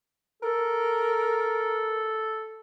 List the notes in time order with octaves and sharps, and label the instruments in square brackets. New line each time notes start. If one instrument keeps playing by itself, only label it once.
[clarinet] A4 [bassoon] A#4